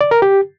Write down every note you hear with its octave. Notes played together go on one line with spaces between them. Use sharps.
D5
A#4
G4